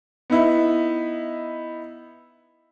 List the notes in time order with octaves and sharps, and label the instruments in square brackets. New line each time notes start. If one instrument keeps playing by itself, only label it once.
[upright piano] B3 D#4 E4